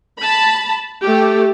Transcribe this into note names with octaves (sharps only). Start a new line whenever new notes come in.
A5 B5
A3 G4